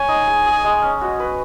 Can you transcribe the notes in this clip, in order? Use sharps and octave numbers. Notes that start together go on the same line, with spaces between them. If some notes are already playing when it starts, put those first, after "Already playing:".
Already playing: C#5 G#5
D#4
G#4
G#4
G#3
C#4
F#4
B4